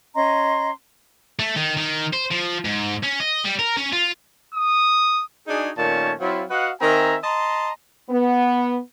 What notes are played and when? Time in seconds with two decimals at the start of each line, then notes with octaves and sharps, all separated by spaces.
0.14 C#4 D#5 A#5 C6
1.39 A3
1.56 D#3
1.77 D#3
2.13 C5
2.31 F3
2.65 G#2
3.03 C#4
3.20 D#5
3.45 G3
3.59 A#4
3.77 C#4
3.92 F4
4.55 D#6
5.48 D4 D#4 F#4 G#4
5.78 A#2 D#3 A3 C#4 C#5 A5
6.20 F#3 C4 E4 F4
6.50 F#4 B4 D#5 F5 F#5
6.81 D#3 C4 A#4 E5 G#5 A#5
7.24 D#5 A5 A#5 C6
8.10 B3